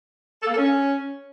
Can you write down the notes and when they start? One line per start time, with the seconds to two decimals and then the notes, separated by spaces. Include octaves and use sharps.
0.42 A4
0.47 A#3
0.52 A4
0.57 C#4